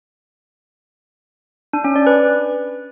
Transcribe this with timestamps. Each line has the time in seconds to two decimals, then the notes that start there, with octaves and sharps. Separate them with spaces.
1.73 D4
1.84 C#4
1.95 D5
2.07 B4